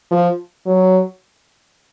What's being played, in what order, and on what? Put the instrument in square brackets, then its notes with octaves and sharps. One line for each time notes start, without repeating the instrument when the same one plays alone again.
[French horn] F3
F#3